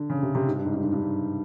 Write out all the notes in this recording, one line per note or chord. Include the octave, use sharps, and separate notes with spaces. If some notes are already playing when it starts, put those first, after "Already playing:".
Already playing: D3
C#3
C3
C3
G#2
G2
G#2
G2
G#2
G2
G#2